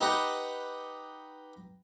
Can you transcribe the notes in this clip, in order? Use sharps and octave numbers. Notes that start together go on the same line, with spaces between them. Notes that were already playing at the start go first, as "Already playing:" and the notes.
D#4 G4 B4 D#5 F#5